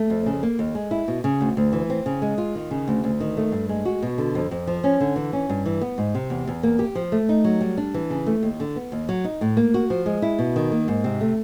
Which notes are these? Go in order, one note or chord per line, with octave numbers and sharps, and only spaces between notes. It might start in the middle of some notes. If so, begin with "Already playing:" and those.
Already playing: A3
F2
C#3
A#3
D#2
G#3
E4
B2
C#3
D2
D2
E3
C4
C#3
G#3
F4
D#3
C#3
D2
D2
D#3
A3
G2
G#3
F#4
B2
D3
F2
F2
F3
C#4
D3
E3
C#4
G2
E3
B3
G#2
C3
E2
E2
A#3
G4
F3
A3
D#4
F#3
G3
D4
E3
C#3
A3
D#2
D3
B3
D#2
F#3
D#4
A2
A#3
F#4
F3
G#3
E4
B2
D#3
A#3
G#2
C3
A3